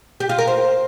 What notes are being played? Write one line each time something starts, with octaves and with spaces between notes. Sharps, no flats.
G4
F4
A#4
C5